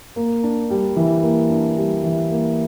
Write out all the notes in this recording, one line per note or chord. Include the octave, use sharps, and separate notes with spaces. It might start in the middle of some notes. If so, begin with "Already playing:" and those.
A#3
D4
G3
E3
A#3
D4
G3
E3
A#3